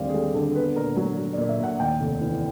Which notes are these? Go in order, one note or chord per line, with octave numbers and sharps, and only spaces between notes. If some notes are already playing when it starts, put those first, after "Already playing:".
Already playing: D#2 D3 G3 C4 D5 F5
G#4
G3 A4
D3 A4
B3 B4
A#2 A#4
F#3 A#4
F#3
D5
A#2
E5
A#2 F#5
D#2 G5
F1
E3